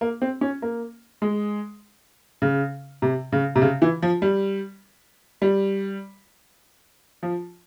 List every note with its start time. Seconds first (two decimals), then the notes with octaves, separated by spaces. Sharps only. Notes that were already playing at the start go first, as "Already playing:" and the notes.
0.01 A#3
0.22 C4
0.41 C#4
0.62 A#3
1.22 G#3
2.42 C#3
3.02 C3
3.32 C#3
3.56 C3
3.62 C#3
3.82 E3
4.02 F3
4.22 G3
5.42 G3
7.23 F3